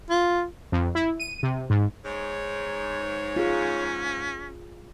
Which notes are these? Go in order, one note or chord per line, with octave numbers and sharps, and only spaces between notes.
F4
F2
E4
D#7
C3
G#2
G#2 C#5
C#4 F4 G#4